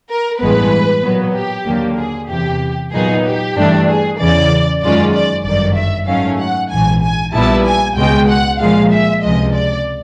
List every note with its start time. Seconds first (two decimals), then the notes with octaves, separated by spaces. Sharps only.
0.09 A#4
0.39 A1 G2 E3 G#3 B3 B4
1.03 A#2 F#3 B3
1.34 G4
1.66 D#2 D3 F#3 A#3
1.97 G#4
2.29 E2 C3 E3 G4
2.92 A#2 F#3 B3 D#4 G#4
3.24 G4
3.55 G2 E3 A3 D4
3.87 G#4
4.18 E2 C#3 E3 D5
4.81 F#2 D#3 G#3 C#4 F4 D5
5.13 D5
5.45 G1 F#2 D#3 D5
5.75 E5
6.07 G#2 D#3 F#3 A3 C#4 F5
6.39 F#5
6.70 A#1 G#2 E3 G#5
7.02 G#5
7.33 A#1 A#2 G3 B3 E4 A5
7.65 G#5
7.96 C#2 B2 G#3 G5
8.28 F#5
8.60 A#2 F3 G#3 F5
8.91 E5
9.23 C#2 C3 F3 G#3 D#5
9.54 D5